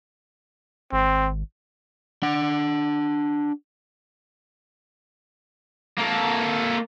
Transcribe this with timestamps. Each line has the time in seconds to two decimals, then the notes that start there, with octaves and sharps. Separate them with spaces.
0.93 G#1 C4
2.23 D4 F#5
5.98 A#3 A4